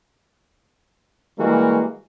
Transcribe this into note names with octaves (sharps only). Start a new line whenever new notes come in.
E3 G3 G#3 A#3 F#4